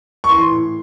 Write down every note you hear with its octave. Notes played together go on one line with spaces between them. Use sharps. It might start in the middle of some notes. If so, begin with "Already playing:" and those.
C#6
E3 C6
A2